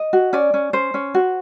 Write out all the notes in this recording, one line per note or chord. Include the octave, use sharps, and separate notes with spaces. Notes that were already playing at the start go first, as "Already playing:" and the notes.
Already playing: D#5
F#4
C#4 D5
C#4
C#4 C5
C#4
F#4